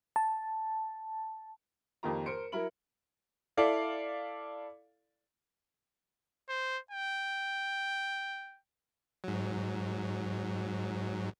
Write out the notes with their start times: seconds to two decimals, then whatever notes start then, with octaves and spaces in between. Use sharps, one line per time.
0.16 A5
2.03 F2 D#3 A#3 F4 G4 A#5
2.26 A#4 C5 C6 C#7 D7
2.52 F#3 E4 A#4 B5 F#7
3.57 E4 A4 D5 F5
6.49 C5
6.91 G5
9.24 G#2 F#3